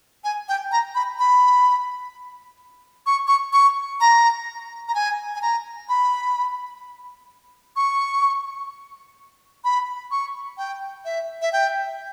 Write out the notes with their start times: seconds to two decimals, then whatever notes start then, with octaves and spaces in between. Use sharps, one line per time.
0.24 G#5
0.49 G5
0.72 A#5
0.95 B5
1.19 B5
3.06 C#6
3.27 C#6
3.53 C#6
4.00 A#5
4.88 A#5
4.95 G#5
5.34 G#5
5.42 A#5
5.89 B5
7.76 C#6
9.64 B5
10.11 C#6
10.58 G5
11.05 E5
11.42 E5
11.53 G5